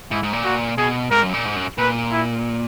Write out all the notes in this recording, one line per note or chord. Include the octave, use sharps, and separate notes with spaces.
G#2 E4
G#2
A#2
F#4
B2 G#4
G#2 A#4
F#2
A#2
G#2
F#2
A#2 B4
E4